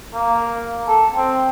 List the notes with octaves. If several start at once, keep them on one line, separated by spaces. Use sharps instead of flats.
A#3
A4
C4